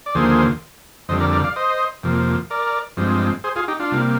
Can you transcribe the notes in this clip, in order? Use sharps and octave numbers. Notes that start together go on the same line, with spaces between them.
D5
D#2 D3 F3 A#3 G#4 C5
F2 D3 G3 C5 D#5
A#4 D5
A#4 D5
D5 F5
C5 D#5
F2 C3 F3 A#3
A#4 D5
G2 F3 G#3 C4
G#4 C5
F4 G#4
D#4 G4
D4 F4
C3 G3 A#3